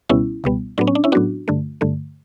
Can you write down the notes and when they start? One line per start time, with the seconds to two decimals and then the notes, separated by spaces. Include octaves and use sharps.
0.09 C#2 B2 G3 B3 C#4 E4
0.44 C#2 B2 G3 B3
0.78 A2 F#3 B3 D4
0.87 C#4
0.95 D4
1.04 C#4 E4
1.12 A2 F#3 B3 D4 F#4
1.48 G2 D3 A3
1.81 G2 D3 A3